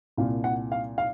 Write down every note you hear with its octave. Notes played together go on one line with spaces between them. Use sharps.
C2 A#2 F5
F#5
F5
F5